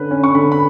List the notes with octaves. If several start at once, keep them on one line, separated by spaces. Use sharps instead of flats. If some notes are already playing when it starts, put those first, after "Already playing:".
Already playing: D3 C#4 B4
C#4
C#6
D3 B5
B5